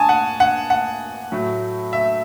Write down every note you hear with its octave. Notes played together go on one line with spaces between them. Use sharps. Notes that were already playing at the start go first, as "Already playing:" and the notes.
Already playing: G#5 A5 C#6 D#6
F#5
F#5
F#5
A2 F#3 A3
E5